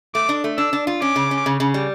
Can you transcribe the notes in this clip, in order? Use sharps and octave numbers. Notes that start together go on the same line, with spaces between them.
A3 D6
D4
A3
D4 E6
D4
F4
C#4 D6
C#3
C#4
C#3
C#3
G3